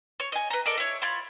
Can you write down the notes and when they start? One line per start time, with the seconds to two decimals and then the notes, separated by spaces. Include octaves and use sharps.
0.20 C#5
0.32 D#5 G#5
0.50 B4 A#5
0.66 A4 A#4 D5 D#5
0.78 E4 C#5
1.02 F4 C#5 B5